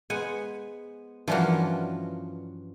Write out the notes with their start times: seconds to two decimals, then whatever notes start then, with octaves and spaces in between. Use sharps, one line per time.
0.10 G#3 B3 C5 F#5 G#5
1.28 G2 E3 F3 A#3 C#4 D4 F4 F#4